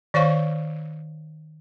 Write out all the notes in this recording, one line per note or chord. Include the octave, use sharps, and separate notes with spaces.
D#3 C5 C#5 F5 C#6